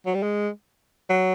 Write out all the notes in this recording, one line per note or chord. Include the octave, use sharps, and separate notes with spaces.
F#3
G3
G#3
F#3